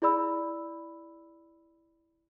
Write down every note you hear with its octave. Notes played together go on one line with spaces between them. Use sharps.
E4 G#4 D5 B5 E6